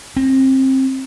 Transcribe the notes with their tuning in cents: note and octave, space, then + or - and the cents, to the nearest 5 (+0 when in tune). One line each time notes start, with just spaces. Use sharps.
C4 +25